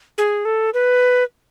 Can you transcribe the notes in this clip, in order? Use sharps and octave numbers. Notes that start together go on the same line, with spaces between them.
G#4
A4
B4